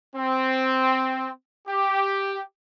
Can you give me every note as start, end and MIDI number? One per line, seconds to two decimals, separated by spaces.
0.16 1.29 60
1.68 2.40 67